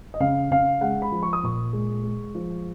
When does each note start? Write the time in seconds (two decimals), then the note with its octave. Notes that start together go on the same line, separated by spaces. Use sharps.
0.14 D#5
0.20 C#3 F5
0.51 C#3 F5
0.81 G#3 F#5
1.02 B5
1.12 F3
1.23 C#6
1.33 D#6
1.43 A#2 C#6
1.73 G#3
2.04 G#3
2.35 F3